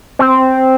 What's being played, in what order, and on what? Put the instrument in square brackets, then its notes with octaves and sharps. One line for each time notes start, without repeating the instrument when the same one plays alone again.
[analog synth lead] C4